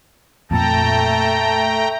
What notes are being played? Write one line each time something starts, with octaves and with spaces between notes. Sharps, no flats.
F2 A#2 A3 G5 A5 A#5